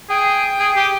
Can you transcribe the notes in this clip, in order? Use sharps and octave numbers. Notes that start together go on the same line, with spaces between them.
G#4 G5
G#4
G4